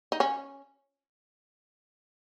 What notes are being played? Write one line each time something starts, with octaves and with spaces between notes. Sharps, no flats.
D#4
C#4